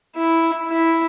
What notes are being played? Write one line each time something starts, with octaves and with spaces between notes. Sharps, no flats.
E4
E4